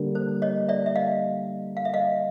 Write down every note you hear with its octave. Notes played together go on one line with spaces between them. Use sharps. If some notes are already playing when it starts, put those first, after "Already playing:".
Already playing: D3 G3 A#3
C5
C#5 D#5
D5 E5
E5
D#5 F5
F5
E5
D#5 F5